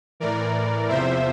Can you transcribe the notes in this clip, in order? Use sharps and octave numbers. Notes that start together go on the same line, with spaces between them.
A2 E3 A#4 D5
E2 C3 F3 C5 E5